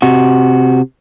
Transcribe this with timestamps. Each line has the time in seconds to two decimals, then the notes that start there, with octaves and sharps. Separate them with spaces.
0.02 C3 F#4